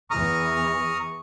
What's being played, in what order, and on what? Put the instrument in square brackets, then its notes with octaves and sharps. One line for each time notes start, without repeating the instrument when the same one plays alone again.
[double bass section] E2 E3 [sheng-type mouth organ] A#5 D#6 F6 [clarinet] C#6